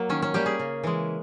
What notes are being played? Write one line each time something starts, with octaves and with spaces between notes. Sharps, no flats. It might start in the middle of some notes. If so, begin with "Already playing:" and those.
Already playing: F#3 A#3
D#3 C#4
C#4
G3 A#3 G4
G#4
C#3
E3 G#3